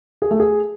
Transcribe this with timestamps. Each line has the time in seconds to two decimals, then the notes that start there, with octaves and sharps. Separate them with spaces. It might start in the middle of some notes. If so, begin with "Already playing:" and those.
0.22 G#4
0.31 A3
0.40 G#4